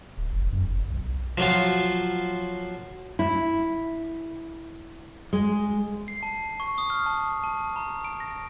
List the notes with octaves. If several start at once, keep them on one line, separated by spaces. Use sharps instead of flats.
D1
F#1
F#2
F#1
B1
F3 F#3 F4
E4
G#3
C7
A5
C#6
D#6
F6
A5
A5
A#5
D7
A#6